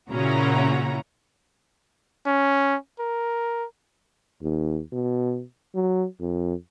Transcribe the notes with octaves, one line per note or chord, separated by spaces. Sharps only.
A#2 C#3 C#4 E4 F#4 A#5
C#4
A#4
D#2
B2
F#3
F2